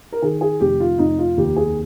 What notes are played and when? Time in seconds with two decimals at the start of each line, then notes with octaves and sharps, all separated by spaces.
0.12 A#4
0.22 D#3 G#4
0.41 G#4
0.60 F1 G4
0.80 F4
0.99 F1 D#4
1.19 F4
1.37 D#2 G4
1.56 G#4